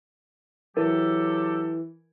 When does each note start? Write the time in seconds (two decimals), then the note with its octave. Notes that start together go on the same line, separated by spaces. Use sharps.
0.77 E3 F#3 G4 A4 A#4